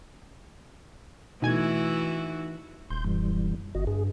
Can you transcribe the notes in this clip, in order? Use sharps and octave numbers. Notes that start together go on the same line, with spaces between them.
B2 E3 A3 D#4 E4 F#4 G#5 G#6
D#1 C6 G6
F#2 E3 G3
G1 F#4 D#5
G2 G#4